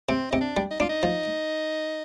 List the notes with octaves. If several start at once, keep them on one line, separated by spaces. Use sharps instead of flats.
C3 C4
C3 D#4
D4
G3
D#4
D4 F4
D#4
F3